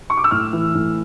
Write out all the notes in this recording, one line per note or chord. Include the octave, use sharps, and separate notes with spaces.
C#6
D6
E6
A2 F6
E3
A2